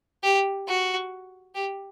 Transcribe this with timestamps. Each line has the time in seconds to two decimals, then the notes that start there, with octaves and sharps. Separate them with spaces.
0.23 G4
0.68 F#4
1.55 G4